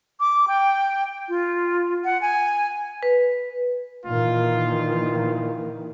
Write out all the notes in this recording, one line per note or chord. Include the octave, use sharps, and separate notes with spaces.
D6
G5
F4
F#5
G#5
B4
A#2 D#3 E3 F4